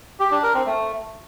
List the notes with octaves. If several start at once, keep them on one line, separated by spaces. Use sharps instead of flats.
G4
D4
A#4
C4
A3